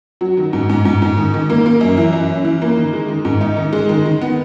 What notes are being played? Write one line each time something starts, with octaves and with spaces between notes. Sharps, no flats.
F#3
D#3
G#2
G#2
G#2
G#2
D#3
D#3
A#3
A#3
F#2
E3
F#2
C#4
E3
A#3
D#3
G#3
D#3
G#2
D#4
D#3
G#3
D#3
D#3
B3